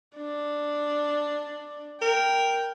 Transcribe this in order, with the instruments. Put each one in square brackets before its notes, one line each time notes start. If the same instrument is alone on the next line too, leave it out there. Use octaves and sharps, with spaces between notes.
[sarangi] D4
[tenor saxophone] A#4 [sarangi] G5